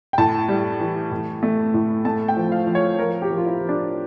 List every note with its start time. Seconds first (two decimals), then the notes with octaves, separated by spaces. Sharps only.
0.13 G5
0.18 A2 A5
0.49 G3
0.80 E3
1.11 A2
1.43 A3
1.74 A2
2.05 A3 A5
2.28 G5
2.36 F3
2.52 F5
2.67 F3
2.75 C#5
2.99 F3 A#4
3.22 G4
3.30 F3
3.38 F4
3.46 E4
3.61 F3
3.69 D4